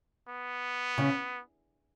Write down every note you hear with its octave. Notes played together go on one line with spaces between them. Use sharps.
B3
C#3